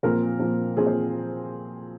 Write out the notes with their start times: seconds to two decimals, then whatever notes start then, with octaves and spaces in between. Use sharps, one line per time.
0.03 A#2 F3 C4 A#4
0.39 A#2 F3 C4
0.76 A#2 F3 C4 G#4
0.87 C5